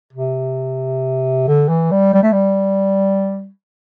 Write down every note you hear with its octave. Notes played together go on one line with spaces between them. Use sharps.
C3
D3
E3
G3
G3
A3
G3